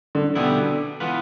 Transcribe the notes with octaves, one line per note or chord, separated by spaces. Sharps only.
D3
B2 D3 G3 B3 E4
E3 B3 F4 B4